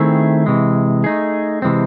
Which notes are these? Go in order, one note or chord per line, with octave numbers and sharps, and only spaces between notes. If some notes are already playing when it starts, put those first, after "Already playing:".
Already playing: D#3 A3 C4 E4 G#4
C3 E3 G#3
A3 D#4 G#4
C3 E3 G#3 C4